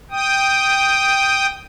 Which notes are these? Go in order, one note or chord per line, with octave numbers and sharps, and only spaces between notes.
G5 D#6